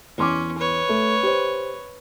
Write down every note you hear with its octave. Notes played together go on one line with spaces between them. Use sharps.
E2 C#4 C6 D6
B4 C#5
A3
G4 C5